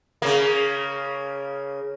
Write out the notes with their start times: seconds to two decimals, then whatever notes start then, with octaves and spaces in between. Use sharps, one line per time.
0.22 C#3 A#3